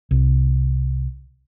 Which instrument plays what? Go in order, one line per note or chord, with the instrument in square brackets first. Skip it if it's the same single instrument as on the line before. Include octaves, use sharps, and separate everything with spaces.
[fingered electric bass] C2